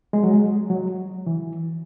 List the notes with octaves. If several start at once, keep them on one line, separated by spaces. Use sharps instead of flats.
G#3
F#3
G#3
F#3
E3